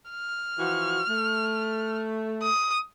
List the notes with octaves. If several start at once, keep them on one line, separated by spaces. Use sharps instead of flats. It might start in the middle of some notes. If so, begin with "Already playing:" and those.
F6
E3 F3 F#4
A3
D#6